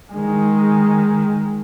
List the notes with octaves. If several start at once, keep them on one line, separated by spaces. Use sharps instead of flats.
D#3 G#3